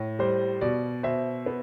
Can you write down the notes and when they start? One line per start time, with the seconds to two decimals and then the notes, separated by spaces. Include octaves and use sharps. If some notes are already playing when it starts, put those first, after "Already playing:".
Already playing: A2
0.19 G3 C5
0.61 B2 D5
1.03 B2 C5 E5
1.46 B3